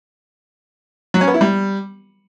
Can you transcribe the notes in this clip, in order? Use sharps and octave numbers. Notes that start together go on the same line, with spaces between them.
F#3
C#4
B3
E4
G3